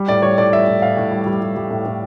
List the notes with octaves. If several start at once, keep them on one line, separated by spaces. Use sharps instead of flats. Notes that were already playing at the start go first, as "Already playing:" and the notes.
Already playing: G3
A2 D5
G3 C#5
A2 D5
G3 E5
A2
A2 F5
A2
G3
G3
G3
G3
A2
A2